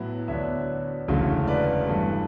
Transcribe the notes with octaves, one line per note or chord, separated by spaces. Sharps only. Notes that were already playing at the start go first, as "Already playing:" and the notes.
Already playing: A2 F#3 B3 E4
D2 D3 F#3 B3 D4 C#5 E5
E1 D2 C#3 F#3 A3
B4 D5
G2 E3 A3